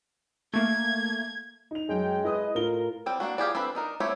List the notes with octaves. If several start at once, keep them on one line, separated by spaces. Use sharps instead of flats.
A3 A#3 G#6
D#4 F7
F#2 G#3 G5
E4 B4 D#5 D#6
A2 F4 A#4 G7
G3 C4 G5
A#3 D4 F#4
F4 G4 G#4 D5
C4 D4 A4 B4
D4 D#4 A#4
A3 C4 E4 G4 C#5